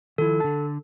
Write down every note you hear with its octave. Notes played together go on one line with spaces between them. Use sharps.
D#3 F3 E4 A4
D3 A5